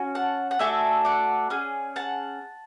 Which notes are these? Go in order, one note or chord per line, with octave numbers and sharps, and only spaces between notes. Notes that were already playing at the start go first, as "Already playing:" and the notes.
Already playing: C#4 F#4
F#5 A5
F#5
A3 D4 F#4 A4 E5 G#5
D5 F#5
C#4 G#4
F#5 A5